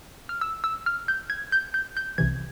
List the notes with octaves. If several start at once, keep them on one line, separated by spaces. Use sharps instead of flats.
F6
E6
E6
F6
G6
G#6
G6
G6
G6
C2 C3 E3 G#6